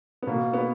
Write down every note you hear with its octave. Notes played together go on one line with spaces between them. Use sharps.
B3
B2 A#3
B3